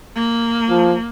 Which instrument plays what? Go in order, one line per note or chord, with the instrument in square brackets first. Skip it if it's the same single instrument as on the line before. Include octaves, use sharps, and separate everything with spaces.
[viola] A#3
[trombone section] F3